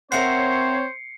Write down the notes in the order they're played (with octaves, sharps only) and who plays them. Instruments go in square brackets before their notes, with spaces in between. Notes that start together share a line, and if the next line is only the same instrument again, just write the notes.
[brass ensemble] C4 C#5 [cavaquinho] A#4 E5 F#5 [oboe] C5 [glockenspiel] C7 C#7